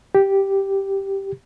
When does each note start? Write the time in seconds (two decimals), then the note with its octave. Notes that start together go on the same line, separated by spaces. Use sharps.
0.15 G4